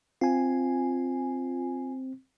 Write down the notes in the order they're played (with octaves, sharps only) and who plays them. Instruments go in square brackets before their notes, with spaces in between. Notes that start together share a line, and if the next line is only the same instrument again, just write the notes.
[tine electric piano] C4 [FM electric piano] F4 G#5